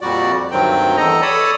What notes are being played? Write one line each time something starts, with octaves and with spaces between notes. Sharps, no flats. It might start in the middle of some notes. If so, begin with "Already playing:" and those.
F2 A#2 G3 F#4 D5
D2 G2 D#3 F#3 C4 G5
E2 A4 D#5 A#5
A4 C#5 D5 A5 B5 D#6